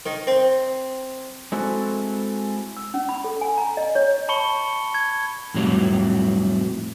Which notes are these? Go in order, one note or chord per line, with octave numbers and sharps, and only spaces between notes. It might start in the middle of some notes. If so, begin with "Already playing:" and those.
D#3
C4
G#3 C4 E4 F#4 A4
E6
C#4
B5
A4
G#5
A#5
D#5
C#5
A5 B5 C#6 C#7 G7
G#6
F2 A2 F#3 G3